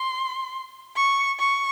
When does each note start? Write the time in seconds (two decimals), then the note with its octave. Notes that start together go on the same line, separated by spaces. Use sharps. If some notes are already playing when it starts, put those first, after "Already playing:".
Already playing: C6
0.96 C#6
1.39 C#6